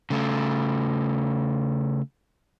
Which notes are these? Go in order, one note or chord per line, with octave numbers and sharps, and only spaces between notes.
C#3 A3